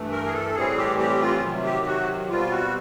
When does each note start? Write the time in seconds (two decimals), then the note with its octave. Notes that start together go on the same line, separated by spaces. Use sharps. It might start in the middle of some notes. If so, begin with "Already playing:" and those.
Already playing: G2 E3 A3
0.11 A#4
0.26 G#4
0.33 A4
0.54 A2 E3 G3 C4 G#4
0.77 G4
0.98 G4
1.20 F4
1.42 C3 D#3 F#3
1.64 G4
1.86 F#4
2.29 B2 G3 C4 F4
2.51 F#4